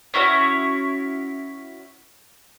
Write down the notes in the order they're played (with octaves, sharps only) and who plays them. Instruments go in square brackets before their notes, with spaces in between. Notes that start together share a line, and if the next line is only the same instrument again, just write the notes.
[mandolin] C#4 E4 F#4 C#5